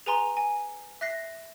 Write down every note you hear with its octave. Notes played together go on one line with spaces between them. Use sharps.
G#4 B4 G#5 A#5 C6
G#5
E5 F#6 A#6 C7